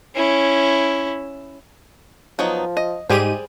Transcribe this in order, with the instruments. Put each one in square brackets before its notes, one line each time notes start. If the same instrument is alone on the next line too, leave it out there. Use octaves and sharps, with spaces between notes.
[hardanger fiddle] C#4 E4
[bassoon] F3 [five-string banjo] F#3 B3 D#4
[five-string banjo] D#5
[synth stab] G#2 G4 D#7 [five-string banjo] G3 G#4 C5 [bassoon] G#3